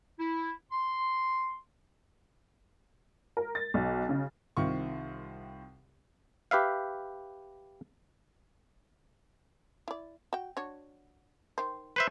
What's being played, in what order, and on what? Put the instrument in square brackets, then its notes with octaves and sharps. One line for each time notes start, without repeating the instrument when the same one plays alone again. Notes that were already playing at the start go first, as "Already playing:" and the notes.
[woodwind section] E4
C6
[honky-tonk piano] A#4
A6
B1
C#3
[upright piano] C2 D#3 C4 F4 C#6
[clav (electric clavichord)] G4 B4 E5 F5
[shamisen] E4 D5
F#4 G5
D4 F#4 C#5
D#3 C5
[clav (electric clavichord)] B4 C5 E5